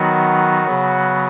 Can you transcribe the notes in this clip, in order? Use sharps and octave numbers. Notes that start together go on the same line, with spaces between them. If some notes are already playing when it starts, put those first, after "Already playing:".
Already playing: D#3 F#3 B3 D#4 F#4
C#3 F#3 B3